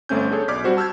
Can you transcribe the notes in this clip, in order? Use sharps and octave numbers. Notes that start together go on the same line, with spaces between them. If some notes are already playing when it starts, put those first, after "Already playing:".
G1 A3 C4 C#4 G6
D4 G#4 A4 C#5
B1 D5 D6 F6 G#6 B6
G3 C4 F#4 C5
A5 E6 F6 G6 G#6